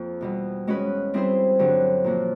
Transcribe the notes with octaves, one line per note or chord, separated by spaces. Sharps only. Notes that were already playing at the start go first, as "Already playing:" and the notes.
Already playing: F2 F3 A#3
E2 B2 G3
G#3 C#4 F#4 B4
G3 C4 E4 G#4 C5
G2 D3 F#3
A#2 F3 A#3 C#4 F#4